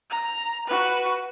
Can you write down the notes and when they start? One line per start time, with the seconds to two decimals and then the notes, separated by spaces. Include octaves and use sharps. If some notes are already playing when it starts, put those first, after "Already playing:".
0.10 A#5
0.68 F#4 B4